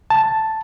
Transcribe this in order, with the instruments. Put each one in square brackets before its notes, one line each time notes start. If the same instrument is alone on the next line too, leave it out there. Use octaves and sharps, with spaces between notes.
[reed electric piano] A5